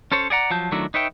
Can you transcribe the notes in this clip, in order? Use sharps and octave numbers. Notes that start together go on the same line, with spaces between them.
C#4 A4 C5 C#5
G#4 D5 F#5 A#5
F3 F#3 A5 G6
D#3 F#3 A3 D4 E4
D#4 B4 C#5 E5 G5